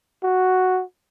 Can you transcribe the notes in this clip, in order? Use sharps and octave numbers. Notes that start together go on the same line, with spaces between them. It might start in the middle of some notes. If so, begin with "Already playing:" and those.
F#4